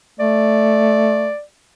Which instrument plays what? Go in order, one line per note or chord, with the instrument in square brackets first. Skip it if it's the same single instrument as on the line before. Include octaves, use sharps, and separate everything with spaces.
[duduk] A3 [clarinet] D5